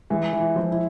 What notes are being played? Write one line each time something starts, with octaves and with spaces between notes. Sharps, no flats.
E3 G#3
E3
E4
F3
E4